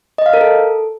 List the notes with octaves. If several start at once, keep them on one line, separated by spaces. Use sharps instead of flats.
D#5
F5
A#4
A4